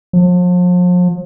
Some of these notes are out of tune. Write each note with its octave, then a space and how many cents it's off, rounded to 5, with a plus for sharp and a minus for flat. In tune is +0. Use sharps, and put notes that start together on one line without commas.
F3 +40